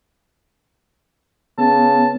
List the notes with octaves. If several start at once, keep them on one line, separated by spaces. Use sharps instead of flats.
C#3 B3 A5